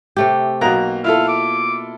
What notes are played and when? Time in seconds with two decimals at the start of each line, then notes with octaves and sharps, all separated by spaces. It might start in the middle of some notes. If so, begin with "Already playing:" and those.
0.17 C3 A3 G4
0.61 B1 B2 A#3 A#5 F#6
1.04 E4 F4 A4 F5
1.28 D6